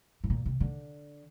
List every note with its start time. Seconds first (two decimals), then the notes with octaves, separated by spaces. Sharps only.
0.24 A2
0.30 A#2
0.46 C3
0.60 D3